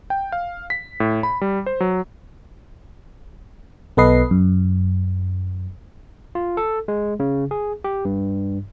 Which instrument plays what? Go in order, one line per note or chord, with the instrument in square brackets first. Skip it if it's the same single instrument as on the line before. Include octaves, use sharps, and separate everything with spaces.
[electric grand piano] G5
F5
B6
A2
B5
G3
C5
F#3
[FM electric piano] B1 B3 A4 B4 D#5 C7
F#2
[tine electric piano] F4
A4
G#3
C#3
G#4
G4
G2